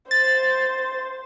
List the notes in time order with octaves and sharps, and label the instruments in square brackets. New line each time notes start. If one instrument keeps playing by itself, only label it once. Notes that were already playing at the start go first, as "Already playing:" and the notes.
[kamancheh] C5 [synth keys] A6